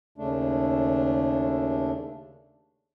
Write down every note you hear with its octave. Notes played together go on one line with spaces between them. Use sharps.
D#2 C#3 A3 D4